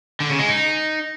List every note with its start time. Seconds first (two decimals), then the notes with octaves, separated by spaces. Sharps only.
0.20 D3
0.30 C#3
0.39 G#3
0.48 D#4